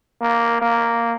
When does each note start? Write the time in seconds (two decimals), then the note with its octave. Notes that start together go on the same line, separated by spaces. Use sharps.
0.21 A#3
0.62 A#3